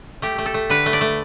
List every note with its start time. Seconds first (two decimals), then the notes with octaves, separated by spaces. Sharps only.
0.22 A3 G4
0.38 A3
0.46 A4
0.54 A3
0.70 D3 B4
0.86 A3
0.93 D5
1.01 A3